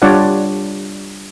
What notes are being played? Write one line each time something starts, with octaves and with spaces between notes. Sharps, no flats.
G3 D4 F4 C#5 D5 F#5